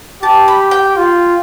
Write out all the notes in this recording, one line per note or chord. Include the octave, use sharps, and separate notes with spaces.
G4 A5
B5
G5
F4